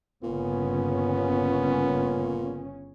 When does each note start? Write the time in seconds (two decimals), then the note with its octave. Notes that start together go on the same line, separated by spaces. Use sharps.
0.23 G1 A#2 C#3 B3 C#4